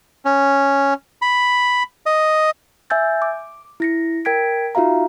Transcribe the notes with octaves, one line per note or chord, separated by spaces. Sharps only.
C#4
B5
D#5
E5 G#5 E6 G6 A6
D6
E4 A#6 C#7
A#4 G5 G#6 B6 D7
D#4 F4 F#4 E5 F5 A#5